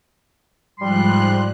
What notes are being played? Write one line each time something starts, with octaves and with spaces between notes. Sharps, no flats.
G#2 F3 G3 C6 F#6